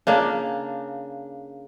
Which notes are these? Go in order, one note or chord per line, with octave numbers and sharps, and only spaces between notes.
C#3 A#3 D4